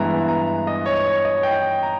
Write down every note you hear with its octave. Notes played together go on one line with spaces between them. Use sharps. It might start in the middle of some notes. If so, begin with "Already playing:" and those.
Already playing: G2 E3 G#3 B3 E4 A#5
A#5
D#5
C#5
C#5
D#5
G5
A#5